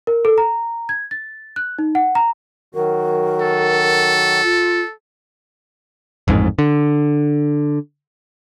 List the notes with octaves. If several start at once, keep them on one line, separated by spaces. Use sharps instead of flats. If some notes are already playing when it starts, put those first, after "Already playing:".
A#4
A4
A#5
G#6
A6
F#6
D#4
F#5
A#5
D#3 F#3 F#4 A#4
A4
F4
A1 F2 G#2
D3